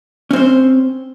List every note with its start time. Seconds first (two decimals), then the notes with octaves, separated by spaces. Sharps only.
0.31 C#4
0.33 C4
0.36 C5